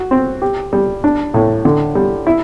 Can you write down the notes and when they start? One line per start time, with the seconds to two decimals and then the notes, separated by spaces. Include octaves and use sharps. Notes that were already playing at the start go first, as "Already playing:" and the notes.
Already playing: F#4
0.11 C4
0.42 G4
0.73 G3
1.04 D4
1.34 A2
1.65 D3
1.95 G3
2.27 E4